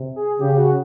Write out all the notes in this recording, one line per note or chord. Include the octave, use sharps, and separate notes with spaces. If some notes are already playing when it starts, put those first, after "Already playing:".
Already playing: C3
G#4
C#3 G4
F#4